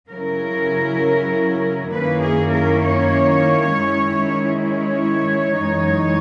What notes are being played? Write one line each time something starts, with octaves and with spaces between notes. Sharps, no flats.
C#3 F#3 C#4 E4 A#4
F#2 D#3 A#3 C#4 E4 B4
G#4
A#4
C#5
D#3 G#3 C#4 E4
C#5
F#2 E3 G#3 D#4